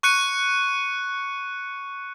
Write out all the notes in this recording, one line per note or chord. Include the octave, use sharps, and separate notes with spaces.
C#6 F#6 C#7 D#7